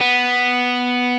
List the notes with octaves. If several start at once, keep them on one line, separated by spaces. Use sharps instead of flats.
B3